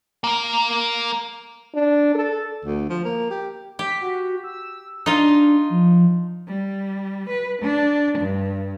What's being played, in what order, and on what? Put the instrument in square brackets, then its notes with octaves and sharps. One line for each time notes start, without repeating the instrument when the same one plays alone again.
[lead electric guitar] A#3 A#4
[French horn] D4
A4
[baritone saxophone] D2
F3
A#3
G4
[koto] G4 [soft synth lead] B6
[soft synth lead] F#4
E6
[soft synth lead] D4 [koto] D#4 F4
[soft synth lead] F3
[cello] G3
B4
D4
G2